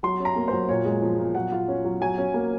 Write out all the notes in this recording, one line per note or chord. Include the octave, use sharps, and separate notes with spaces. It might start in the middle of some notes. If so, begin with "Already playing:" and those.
F#3 C6
C#4
A#5
A#3
F#3 C5
A#2 C#5
G#3
F3
A#2
F#3 F#5
F4
C#4
F#3
F#3 G#5
C#4
A#3